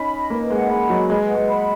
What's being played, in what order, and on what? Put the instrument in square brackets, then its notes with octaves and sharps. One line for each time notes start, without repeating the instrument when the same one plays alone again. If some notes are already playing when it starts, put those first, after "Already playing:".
Already playing: [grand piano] C#4 D#4 [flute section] B5
[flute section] D#5
[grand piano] A#3 [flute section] B4
[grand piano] G#3 [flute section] F#5
[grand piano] G#3 [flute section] B5
[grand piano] F#3 [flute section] D#5
[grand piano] G#3 [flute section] B4
[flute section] F#5
[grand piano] G#3
[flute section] B5